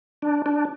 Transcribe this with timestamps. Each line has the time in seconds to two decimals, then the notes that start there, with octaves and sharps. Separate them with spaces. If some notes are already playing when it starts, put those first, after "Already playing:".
0.22 D4
0.46 D4